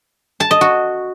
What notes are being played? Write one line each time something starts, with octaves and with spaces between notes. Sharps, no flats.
A5
D#5
F#4